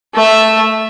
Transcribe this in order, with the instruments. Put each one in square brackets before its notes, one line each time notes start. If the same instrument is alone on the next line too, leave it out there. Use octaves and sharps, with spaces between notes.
[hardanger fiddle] A3 E5